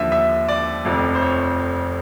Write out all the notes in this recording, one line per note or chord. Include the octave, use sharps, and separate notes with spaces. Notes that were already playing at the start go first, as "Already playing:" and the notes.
Already playing: D#2 D3 F3 E5
E5
D5
F1 F2 C3
C5
C#5